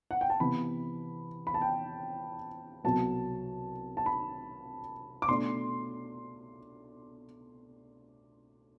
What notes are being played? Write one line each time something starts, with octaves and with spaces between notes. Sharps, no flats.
F#5
G5
A5
C3 E3 B3 B5
B5
A5
G5
C2 B2 F#3 B3 A5
A5
B5
D6
B2 A3 D4 C6